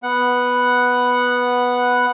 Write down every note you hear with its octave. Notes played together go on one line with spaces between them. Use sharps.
B3 F#5